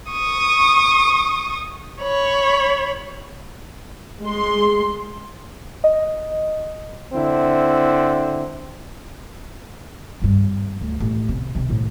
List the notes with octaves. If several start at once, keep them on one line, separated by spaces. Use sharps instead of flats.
C#6 D#6
C#5 B5
G#3 C6
D#5
D3 C4 E4
G#1 G2
D2
A1
C3
C3 D#3
A2 C3